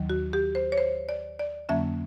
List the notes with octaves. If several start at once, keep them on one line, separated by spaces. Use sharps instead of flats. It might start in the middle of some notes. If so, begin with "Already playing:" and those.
Already playing: D#2 D#3 F#3
F#4
G4
C5
C#5
C5
D5
D5
F2 D3 F#3 A#3 C#4 E5